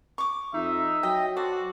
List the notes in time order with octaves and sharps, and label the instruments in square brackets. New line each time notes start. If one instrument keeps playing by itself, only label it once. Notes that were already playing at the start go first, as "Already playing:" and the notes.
[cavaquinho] C#6 D6
[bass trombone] F2 [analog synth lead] D#4 [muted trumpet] E5
[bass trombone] F#3 [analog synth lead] D#5 [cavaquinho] G5
[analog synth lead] F#4 [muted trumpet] A4 [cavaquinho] C5 D5